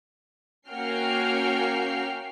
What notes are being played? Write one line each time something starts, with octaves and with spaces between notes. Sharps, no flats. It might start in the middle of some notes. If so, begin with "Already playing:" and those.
A#3 C#4 F#4 G5 F6 C7